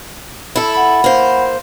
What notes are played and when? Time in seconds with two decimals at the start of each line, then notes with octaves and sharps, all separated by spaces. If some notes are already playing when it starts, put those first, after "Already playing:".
0.56 E4 A4
0.75 F#5 B5
1.04 A#3 C5